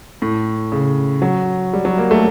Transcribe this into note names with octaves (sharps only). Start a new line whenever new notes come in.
A2
C#3
F#3
G3
F#3
A#3
A3